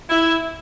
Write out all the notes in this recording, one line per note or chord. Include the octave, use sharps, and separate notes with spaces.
E4